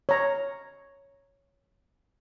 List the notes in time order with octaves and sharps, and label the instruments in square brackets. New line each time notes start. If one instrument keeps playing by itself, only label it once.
[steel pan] C#5 A#5